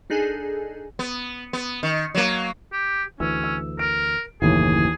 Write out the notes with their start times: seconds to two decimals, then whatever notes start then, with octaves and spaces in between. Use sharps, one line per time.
0.10 D4 D#4 G#4 A4 G#5
0.99 B3
1.53 B3
1.83 D#3
2.15 F#3 A#3
2.73 G4
3.20 D2 E3 C#4 E6
3.44 E6
3.79 A#4 D7
4.42 F#1 D#2 A2 C#3 E3 G#4